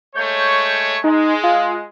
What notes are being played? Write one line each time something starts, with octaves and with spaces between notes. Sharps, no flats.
G#3 A3 C#5 G6
G#3 D#4
F4